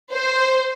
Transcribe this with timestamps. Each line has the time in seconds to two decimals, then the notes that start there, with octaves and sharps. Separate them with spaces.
0.13 C5